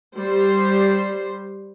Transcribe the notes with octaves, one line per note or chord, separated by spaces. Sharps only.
G3 C5